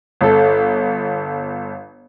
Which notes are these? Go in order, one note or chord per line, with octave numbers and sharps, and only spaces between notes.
G1 A4